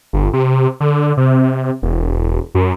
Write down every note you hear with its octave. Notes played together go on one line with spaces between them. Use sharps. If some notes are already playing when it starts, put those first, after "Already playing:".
G1
C3
D3
C3
E1
F#2